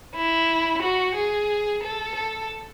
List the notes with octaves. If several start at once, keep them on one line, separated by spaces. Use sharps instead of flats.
E4
F#4
G#4
A4
A4